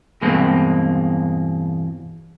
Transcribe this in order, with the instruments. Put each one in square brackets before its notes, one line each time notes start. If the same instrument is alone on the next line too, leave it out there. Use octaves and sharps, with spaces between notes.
[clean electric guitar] E2 G2 B2 G#3 A#3 C4